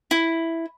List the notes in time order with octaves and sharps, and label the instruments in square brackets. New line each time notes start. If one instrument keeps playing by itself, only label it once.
[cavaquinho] E4